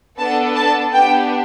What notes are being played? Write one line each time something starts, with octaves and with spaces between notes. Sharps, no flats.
B3 D4 A4 A5
A5
B3 D4 G4 G5